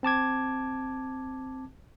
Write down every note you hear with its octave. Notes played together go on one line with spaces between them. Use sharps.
C4 A5 D6 G#6